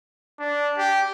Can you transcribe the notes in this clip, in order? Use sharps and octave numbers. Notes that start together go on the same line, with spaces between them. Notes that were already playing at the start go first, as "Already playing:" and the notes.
D4
G4